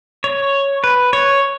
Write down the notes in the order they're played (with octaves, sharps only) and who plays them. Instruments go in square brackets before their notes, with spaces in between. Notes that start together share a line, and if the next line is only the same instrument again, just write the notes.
[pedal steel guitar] C#5
B4
C#5